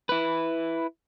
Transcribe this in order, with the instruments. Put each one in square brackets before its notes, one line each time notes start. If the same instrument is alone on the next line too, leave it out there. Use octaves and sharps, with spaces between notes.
[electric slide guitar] E4 B4